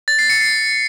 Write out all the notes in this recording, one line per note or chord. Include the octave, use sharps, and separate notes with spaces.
A6
C7
C#7
C7